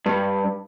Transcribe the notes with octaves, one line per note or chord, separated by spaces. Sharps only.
G2